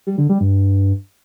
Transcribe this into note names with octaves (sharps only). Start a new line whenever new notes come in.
G3
D3
G3
G2